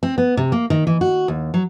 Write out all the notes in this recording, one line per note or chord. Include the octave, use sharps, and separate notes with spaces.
C4
B3
C3
A#3
D#3
E3
F#4
D#2
F#3